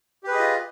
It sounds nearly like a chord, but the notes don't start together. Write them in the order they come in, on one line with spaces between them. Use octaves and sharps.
G4 B4 G#4 D#5 F4